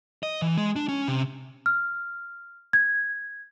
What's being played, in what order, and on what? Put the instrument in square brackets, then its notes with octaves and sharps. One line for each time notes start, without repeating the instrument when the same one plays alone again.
[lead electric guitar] D#5
E3
G#3
D4
C#4
C3
[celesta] F6
G#6